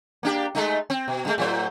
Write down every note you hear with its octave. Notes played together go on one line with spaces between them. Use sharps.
A#3 D4 G4
G#3 A3 D#4
C4
B2
G2 G#3 A3
A2 F#3 C5